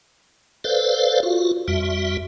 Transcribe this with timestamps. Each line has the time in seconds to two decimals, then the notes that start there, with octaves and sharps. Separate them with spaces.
0.64 A4 B4 C5 D5 F5
1.23 F4 F#4
1.68 F2 G3 F#4 E5